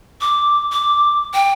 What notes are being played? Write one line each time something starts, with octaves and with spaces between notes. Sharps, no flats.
D6
D6
G5